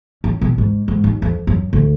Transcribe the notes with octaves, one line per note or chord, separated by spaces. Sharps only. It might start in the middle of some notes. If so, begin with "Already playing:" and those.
C#4
B2
G#2
G#2
D#2
F2
F#2
D2